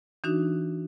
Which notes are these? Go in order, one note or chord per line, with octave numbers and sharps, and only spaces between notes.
E3 D4 D#4 F#4